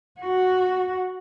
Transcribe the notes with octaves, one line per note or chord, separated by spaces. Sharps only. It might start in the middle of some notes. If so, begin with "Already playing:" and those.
F#4